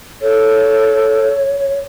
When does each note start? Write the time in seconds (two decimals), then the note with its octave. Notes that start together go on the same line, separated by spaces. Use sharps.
0.22 A4 C#5